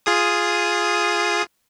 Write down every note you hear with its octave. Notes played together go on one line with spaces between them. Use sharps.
F4 G#4 D#6